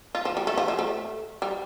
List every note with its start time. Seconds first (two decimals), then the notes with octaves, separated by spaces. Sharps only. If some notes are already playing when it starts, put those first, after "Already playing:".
0.15 F4
0.25 F3
0.37 G3
0.47 A3
0.57 F3
0.68 F3
0.79 A3
1.42 G3